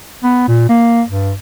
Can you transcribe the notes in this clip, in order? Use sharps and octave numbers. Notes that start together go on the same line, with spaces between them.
B3
A#2
A#3
G2